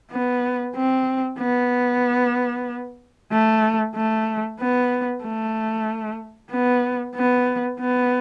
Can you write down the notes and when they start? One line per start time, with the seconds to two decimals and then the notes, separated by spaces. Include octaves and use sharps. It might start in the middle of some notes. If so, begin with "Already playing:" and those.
0.11 B3
0.75 C4
1.39 B3
3.32 A3
3.95 A3
4.60 B3
5.23 A3
6.50 B3
7.15 B3
7.80 B3